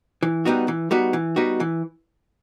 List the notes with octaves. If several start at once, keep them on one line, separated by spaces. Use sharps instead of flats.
E3
G3 B3 D#4 F#4
E3
G3 B3 D#4 F#4
E3
G3 B3 D#4 F#4
E3